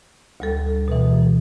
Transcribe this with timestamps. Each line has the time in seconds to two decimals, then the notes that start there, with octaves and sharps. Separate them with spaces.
0.40 D2 G3 A4
0.88 B2 E3